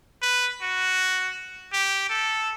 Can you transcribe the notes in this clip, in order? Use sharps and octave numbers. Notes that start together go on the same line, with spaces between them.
B4
F#4
G4
A4